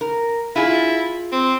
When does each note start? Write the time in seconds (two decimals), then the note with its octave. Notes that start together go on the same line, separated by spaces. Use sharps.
0.01 A#4
0.56 E4 F4 G#4
1.32 C4